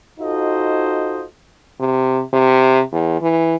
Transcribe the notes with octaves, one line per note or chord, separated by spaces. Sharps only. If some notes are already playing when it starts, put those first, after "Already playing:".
D#4 F4 F#4 A4 C5 D#5
C3
C3
E2
E3